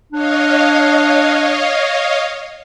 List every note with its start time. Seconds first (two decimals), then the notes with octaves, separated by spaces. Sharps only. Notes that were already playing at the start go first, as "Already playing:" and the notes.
0.12 D4 C#5 D#5 F5